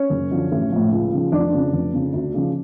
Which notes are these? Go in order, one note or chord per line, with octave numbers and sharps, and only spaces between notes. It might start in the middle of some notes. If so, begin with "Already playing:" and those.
Already playing: C#4 C#5
F#1
F#2 D3 F3
A1
A2 F3
C#2
C#3 F3
F1 D4 D5
F2 C#3
F1
F2 C#3
D2
C#3 F3